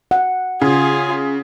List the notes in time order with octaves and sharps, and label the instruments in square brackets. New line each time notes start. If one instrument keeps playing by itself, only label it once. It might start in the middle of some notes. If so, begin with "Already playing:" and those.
[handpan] F#5
[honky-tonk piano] C#3 [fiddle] F4 G#4